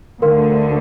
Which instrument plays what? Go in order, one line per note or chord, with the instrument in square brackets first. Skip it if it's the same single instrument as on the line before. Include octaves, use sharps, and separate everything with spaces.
[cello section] D2 D3 [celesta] A#4 F5 C6